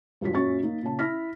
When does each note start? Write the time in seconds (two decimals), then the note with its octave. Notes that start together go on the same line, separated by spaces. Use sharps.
0.21 E1 G2 F#3 F4 B6
0.34 F#2 A#2 F#3 C#4 C#6 A6
0.63 A#3 D#4
0.83 A#2 C#3 A5
0.99 E4 F6 A#6 B6